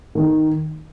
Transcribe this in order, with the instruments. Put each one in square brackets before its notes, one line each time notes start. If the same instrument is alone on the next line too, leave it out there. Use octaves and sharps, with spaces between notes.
[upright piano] D#3